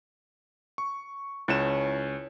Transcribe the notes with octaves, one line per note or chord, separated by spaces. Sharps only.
C#6
C#2 C#4 E4 C#5 E7